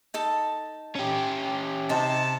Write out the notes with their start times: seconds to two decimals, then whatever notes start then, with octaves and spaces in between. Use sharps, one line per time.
0.14 D#4 A4 A5
0.95 C#4 G4
1.89 C3 D#4 G5 A5